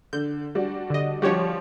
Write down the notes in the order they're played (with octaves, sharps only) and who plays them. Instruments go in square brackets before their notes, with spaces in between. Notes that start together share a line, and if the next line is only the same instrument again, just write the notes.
[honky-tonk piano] D3 [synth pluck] G6
[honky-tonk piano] G3 D4 F#4
[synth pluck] D3 D#5
[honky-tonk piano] F3 G3 [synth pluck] F#4 G4 C#5